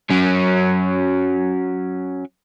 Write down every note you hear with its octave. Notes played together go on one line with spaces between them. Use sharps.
F#3 C#4